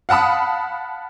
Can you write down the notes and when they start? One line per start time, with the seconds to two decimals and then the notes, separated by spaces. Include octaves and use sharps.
0.09 F5 F#5 A5 B5 D#6